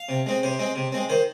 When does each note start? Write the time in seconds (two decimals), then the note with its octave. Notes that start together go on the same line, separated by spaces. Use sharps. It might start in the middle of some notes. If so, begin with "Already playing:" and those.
Already playing: F5
0.09 C3
0.26 G#3 C4
0.43 C3 C5
0.59 G#3 C4
0.76 C3
0.92 G#3 C4
1.09 D#3 C5